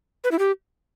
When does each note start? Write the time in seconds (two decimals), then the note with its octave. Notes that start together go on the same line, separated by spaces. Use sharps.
0.24 B4
0.31 E4
0.39 G4